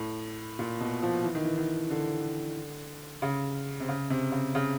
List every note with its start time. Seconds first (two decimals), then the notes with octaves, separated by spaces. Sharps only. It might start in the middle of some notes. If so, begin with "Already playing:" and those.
Already playing: A2
0.59 A#2
0.80 B2
1.02 F3
1.24 E3
1.35 D#3
1.45 E3
1.57 D#3
1.90 D3
3.22 C#3
3.80 C3
3.89 C#3
4.10 C3
4.32 C#3
4.55 C#3